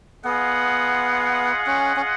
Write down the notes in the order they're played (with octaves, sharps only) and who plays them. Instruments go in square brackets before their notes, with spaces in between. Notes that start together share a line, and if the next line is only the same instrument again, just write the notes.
[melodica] B3 [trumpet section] F4 G#4 D#5 F#5
[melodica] C#4
C#4